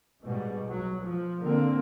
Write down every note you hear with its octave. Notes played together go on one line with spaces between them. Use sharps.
G#2 B2 G3
F#3
F3
D3 A#3 C4